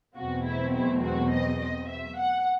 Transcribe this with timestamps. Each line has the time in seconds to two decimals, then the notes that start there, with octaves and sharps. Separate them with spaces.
0.17 E2 B2 F#3 A3 C4 F#4
0.45 E4
0.75 E4
1.03 F#4
1.31 D#5
1.61 D#5
1.89 E5
2.18 F#5